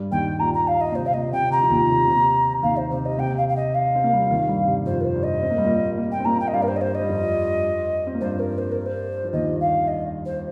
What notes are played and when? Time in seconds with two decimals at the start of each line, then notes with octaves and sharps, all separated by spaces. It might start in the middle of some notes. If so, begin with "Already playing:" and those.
Already playing: G2 G3
0.11 D#2 D#3 G5
0.40 A#2 A#5
0.54 A#5
0.67 F5
0.81 D#5
0.92 A#2
0.95 C3 C5
1.06 F5
1.09 C3
1.14 A#2 D#5
1.32 C3 G5
1.51 C3 A#5
1.63 F3
1.70 D#2 D#3
1.89 C3
2.07 C3
2.63 D#2 D#3 F5
2.77 C5
2.90 C3 C5
3.05 D#5
3.18 C3 G5
3.37 F5
3.49 F5
3.56 D#5
3.75 F5
3.95 C4
4.04 A#3
4.13 G3
4.22 F3
4.30 D#2 D#3
4.48 G2 G3
4.67 C3
4.86 F2 F3 C5
5.01 A#4
5.04 C5
5.14 G2 G3
5.23 D#5
5.42 C4
5.50 A#3
5.58 G3
5.65 A#2 A#3
5.97 A#2 A#3
6.11 G5
6.20 C4
6.25 A#2 A#3 A#5
6.40 G5
6.48 D#5
6.53 G2 G3 F5
6.62 A#4
6.68 C5
6.76 D#5
6.81 C5
6.95 D#5
7.01 G3
7.09 F2 F3
8.07 C4
8.14 A#3
8.20 G2 G3 C5
8.39 A#4
8.58 C5
8.72 A#4
8.86 C5
9.24 F3
9.33 D#2 D#3 D#5
9.60 F5
9.88 D#5
10.25 C5